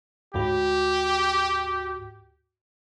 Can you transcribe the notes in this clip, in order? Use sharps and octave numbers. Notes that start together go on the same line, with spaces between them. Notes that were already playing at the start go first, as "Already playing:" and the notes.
D2 G#2 F#4 G4